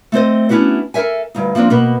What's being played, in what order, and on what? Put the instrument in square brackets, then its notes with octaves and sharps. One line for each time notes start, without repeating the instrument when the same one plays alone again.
[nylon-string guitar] A3 C4 C5 D#5
B3 C#4 D4 E4 F#4 C5
A4 A#4 C5 E5 G#5
D2 G2 D#4
F3 A#3 C4 D4
B2 A#3 B3